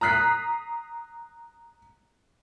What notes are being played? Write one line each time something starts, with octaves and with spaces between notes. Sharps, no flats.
A#5 D#6 F#6 B6 C7